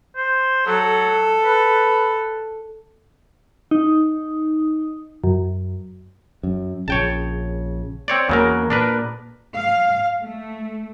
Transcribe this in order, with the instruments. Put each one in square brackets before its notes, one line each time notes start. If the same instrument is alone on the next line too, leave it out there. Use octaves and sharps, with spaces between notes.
[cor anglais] C5
[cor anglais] F#3 [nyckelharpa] A4
[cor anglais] B4
[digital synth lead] D#4
F#2
[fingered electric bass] F#2
[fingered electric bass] A#1 C#3 [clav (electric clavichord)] C#5 G5 A5
[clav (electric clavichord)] C4 C#5 D5
[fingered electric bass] E2 A#3 [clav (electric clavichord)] C#3 F#3 A#4
[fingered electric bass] A#2 [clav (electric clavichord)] D4 A#4 B4
[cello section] F5
A3